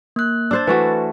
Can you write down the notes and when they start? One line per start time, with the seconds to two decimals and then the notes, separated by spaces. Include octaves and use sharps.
0.16 A#3 F#6
0.51 D4 C5 E6 A6
0.67 E3 A3 F#4 B4